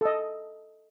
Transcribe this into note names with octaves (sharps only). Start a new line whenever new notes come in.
A4 D#5